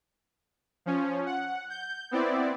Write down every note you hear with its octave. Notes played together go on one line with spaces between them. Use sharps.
F3 C#4
F#5
G6
B3 C4 E4 D5